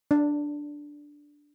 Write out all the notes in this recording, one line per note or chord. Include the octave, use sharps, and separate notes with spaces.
D4